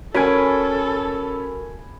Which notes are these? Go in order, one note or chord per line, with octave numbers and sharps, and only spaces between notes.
C#4 F#4 A4 A#4 G#5 B5 D7